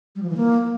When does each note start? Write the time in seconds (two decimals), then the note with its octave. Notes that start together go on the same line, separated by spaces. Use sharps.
0.16 G3
0.23 F3
0.30 E3
0.37 A#3